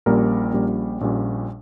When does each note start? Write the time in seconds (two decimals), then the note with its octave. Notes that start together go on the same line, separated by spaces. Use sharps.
0.06 A#1 A#2 G3 A#3 C#4 A#4
0.53 A#1 A#2 G3 C#4
1.01 A#1 A#2 G3 C#4